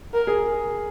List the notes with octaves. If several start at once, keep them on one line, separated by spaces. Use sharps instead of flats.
A#4
G#4